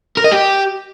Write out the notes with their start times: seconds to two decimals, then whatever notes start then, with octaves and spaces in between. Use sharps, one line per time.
0.17 A#4
0.24 D#5
0.32 G4